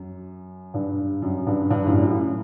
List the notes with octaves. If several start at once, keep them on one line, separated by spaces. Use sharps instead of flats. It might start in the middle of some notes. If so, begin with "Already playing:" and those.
Already playing: F#2
G2
F#2
G2
G2
F#2 A2
F#2 A2